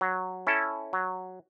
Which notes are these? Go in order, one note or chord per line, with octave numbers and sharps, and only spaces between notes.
F#3
C#4 E4 A4
F#3